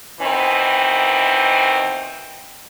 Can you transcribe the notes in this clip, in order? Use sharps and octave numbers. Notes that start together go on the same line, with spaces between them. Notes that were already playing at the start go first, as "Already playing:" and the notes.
B2 D#3 E3 C4